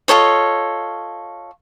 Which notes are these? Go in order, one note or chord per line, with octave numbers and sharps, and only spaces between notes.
F4 A4 C#5 D#5